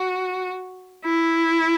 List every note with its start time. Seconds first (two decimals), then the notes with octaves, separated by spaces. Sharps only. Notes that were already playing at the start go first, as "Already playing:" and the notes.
Already playing: F#4
1.05 E4